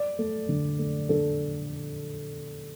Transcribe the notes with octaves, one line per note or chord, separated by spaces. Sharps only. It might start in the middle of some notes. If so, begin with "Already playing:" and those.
Already playing: D5
A3
D3
A3
D3 A4